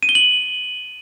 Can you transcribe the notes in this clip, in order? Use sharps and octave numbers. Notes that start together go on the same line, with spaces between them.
D#7
G7
F#7